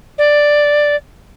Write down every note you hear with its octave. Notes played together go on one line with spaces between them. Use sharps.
D5